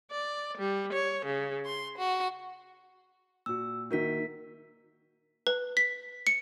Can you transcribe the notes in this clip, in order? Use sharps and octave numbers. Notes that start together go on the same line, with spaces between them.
D5
G3
C#5
C#3
C6
F#4
A#2 F#4 E6
D#3 A#3 F#4 A#4 B6
B4
B6
C#7